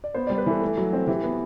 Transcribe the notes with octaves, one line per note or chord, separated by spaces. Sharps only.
D5
B3 C5
G3 D5
B4
E3 A4
A3
F#3
C4
E3 G4
B3